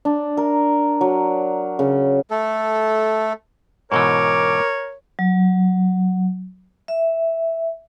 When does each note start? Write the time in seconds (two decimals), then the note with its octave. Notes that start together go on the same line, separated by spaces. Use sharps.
0.05 D4
0.37 A#4
1.01 F#3
1.79 C#3
2.31 A3 A4
3.92 G#2 B2 E3 A#4 C#5 D6
5.19 F#3
6.88 E5